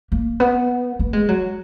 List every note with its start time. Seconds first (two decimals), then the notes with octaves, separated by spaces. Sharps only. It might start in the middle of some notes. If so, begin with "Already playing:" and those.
0.12 A#3
0.40 B3
0.99 A#3
1.13 G#3
1.29 F#3